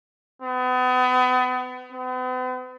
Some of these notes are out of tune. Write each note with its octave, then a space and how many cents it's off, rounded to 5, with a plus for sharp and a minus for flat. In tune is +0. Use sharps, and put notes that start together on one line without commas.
B3 +35
B3 +45